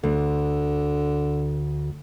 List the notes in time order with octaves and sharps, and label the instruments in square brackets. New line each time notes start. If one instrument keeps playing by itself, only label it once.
[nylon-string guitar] D2 [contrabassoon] D3